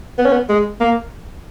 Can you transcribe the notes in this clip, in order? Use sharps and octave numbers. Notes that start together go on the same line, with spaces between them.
B3
C#4
B3
G#3
A#3